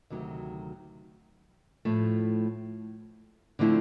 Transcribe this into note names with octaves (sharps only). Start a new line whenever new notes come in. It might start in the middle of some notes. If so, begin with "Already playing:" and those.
D2 C3 D#3 F#3
A2 F3 A3
D3 F3 A3 C4 E4